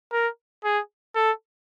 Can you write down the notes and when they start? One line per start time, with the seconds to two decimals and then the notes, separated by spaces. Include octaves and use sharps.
0.12 A#4
0.64 G#4
1.15 A4